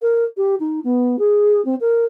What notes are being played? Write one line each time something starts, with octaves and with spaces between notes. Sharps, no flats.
A#4
G4
D#4
B3
G#4
C4
A#4